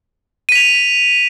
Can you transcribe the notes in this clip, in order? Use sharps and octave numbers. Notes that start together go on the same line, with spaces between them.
B6 D#7 F7